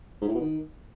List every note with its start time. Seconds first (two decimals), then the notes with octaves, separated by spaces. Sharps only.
0.22 G#2
0.28 A2
0.34 B2
0.41 D#3